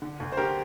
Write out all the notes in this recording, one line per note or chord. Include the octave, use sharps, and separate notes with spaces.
D3
D2
C5
D3 G4 A#4